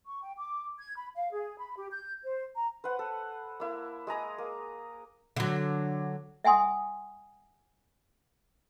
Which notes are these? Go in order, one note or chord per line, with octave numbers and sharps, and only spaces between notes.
C#6
G5
D6
G#6
B5
F5
G#4
B5
G4
G6
C5
A#5
B4 C5 F#5
A4
A#3 E4
G#3 G#4 A#5 D#6
A#3
D3 F#3
E5 F#5 G#5 C6 D#6